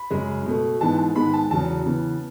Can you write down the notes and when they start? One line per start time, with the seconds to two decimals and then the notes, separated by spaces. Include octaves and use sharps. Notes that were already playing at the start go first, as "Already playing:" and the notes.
Already playing: B5
0.11 F#2 C#3 G#3
0.46 B2 A3
0.81 G#2 E3 G#3 B3 A5
0.98 A5
1.16 G#2 D#3 G#3 B3 B5
1.33 A5
1.51 E2 C#3 F#3 A5
1.86 C#3 E3 B3